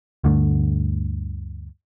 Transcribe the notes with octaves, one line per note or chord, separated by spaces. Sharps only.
D2 G2 D3 A3